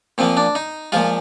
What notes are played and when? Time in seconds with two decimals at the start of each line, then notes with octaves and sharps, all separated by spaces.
0.18 A#2 F3 A#3 C4
0.37 D4
0.55 D#4
0.92 A#2 F3 G#3 F4